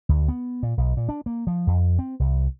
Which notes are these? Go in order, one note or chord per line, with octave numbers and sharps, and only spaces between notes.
D2
B3
A#2
B1
A#2
D4
A#3
F3
F2
C4
C2